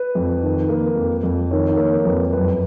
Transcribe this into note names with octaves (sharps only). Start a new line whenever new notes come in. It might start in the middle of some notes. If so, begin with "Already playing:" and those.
Already playing: B4
F2
D#3
A#3
F2
F2
D#3 C#5
A#3 C#5
F2 B4
F#2 B4